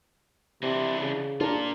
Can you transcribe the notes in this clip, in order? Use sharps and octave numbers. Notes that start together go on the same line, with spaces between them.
C3 E3 D4
C#3
D4 F4 A#4